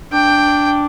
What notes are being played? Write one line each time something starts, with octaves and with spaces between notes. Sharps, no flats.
D4 G5